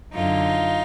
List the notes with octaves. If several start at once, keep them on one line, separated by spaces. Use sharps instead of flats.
F#2 D3 D#4 F4